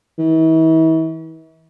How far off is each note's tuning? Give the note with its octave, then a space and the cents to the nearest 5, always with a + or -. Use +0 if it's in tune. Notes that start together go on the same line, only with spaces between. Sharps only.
E3 -40